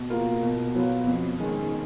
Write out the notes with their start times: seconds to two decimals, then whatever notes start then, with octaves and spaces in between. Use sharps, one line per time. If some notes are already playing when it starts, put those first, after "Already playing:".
Already playing: B2
0.10 A#3 F4 A#4
0.43 B2
0.75 F#3 B3 F4
1.07 F2
1.39 D#3 G#3 C#4